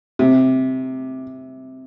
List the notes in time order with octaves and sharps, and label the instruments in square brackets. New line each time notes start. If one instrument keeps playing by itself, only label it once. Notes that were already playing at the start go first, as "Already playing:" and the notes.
[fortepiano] C3